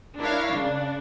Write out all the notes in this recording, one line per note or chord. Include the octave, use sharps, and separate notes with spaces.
D4 E4 A#4 C#5 F5
C#3 D4